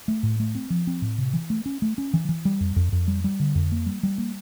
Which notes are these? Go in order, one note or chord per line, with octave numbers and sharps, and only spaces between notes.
A3
A2
A3
C4
F3
C4
A2
C3
E3
A3
C#4
A3
C#4
E3
E3
G3
F2
F2
F2
G3
G3
D3
F2
A#3
G3
G3
A#3